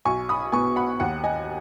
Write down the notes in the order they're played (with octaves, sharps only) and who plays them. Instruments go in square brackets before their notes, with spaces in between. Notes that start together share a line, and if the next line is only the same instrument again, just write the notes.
[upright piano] B1 G#5 C#6
B5 D#6
B2 B3 G#5 C#6
F#5 B5
D#2 F#5
D#5 G#5